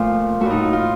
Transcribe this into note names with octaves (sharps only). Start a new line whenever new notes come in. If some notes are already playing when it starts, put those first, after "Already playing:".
Already playing: A#2 F3 A3 F4
A2 A3 F#4
D#4
F4
F4